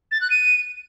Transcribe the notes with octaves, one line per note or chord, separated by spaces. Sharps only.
A6
F#6
D#7